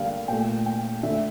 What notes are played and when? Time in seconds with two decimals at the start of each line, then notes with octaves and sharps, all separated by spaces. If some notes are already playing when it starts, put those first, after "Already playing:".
Already playing: D3 G3 A#3 F5 G5
0.28 A#2 A3 G5
0.66 G5
1.03 D3 A3 E5